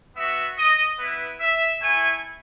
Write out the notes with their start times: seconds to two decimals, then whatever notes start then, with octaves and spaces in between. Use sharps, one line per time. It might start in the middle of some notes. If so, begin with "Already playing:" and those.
0.16 B3 F#4 E5
0.58 D#5
0.99 B3 E4 B4
1.40 E5
1.81 A3 E4 G#5